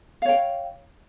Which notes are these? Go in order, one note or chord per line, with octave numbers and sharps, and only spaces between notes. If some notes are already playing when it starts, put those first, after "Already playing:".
C#5 F5 G5